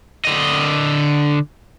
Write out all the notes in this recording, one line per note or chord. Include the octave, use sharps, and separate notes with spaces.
D3 D#5